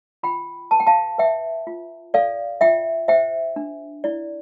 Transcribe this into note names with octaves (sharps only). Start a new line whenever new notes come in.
F4 G5 B5
B4 A5
G5
F5 A5
B4 E5 G5
F4
A4 D5 F5
F4 E5 G5
C5 E5 G5
D4
E4 D5